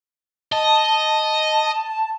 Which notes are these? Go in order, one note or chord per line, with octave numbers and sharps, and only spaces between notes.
D#5 A5